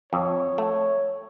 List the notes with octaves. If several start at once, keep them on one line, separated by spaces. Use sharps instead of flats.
F2 C#5
A3